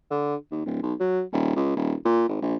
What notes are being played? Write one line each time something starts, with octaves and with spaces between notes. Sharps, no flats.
D3
D#2
D1
B1
F#3
D#1
C#2
D#1
A#2
G#1
A#1